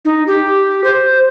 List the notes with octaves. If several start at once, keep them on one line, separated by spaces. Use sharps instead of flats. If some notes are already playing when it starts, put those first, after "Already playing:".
D#4
G4
C5